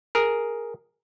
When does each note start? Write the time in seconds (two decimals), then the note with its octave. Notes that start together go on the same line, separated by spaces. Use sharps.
0.15 G#4 A#4